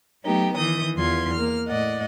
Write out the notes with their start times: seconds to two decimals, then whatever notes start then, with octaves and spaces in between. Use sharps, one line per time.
0.24 F#3 A3 B3 D#4 G4
0.54 D#3 E3 D#6 G6
0.96 E2 F4 C6 G#6
1.33 A#3 F6
1.68 A2 D5 D#5 F#5